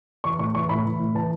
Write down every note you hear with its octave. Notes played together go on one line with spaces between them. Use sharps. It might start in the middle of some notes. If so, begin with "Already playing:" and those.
E3 C#6
A2 C#6
E3 C#6
A2 B5
E3
A2
E3 A5